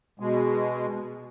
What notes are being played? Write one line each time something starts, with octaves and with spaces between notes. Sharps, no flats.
B2 G#3